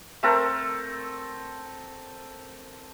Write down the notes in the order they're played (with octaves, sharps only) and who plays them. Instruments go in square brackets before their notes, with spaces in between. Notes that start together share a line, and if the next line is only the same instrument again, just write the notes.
[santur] A3 C4 A4 A#4